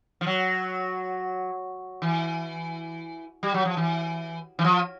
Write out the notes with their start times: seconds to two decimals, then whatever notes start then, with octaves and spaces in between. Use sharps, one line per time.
0.21 F3
0.27 F#3
2.02 E3
3.43 G3
3.54 F#3
3.65 F3
3.77 E3
4.59 E3
4.64 F3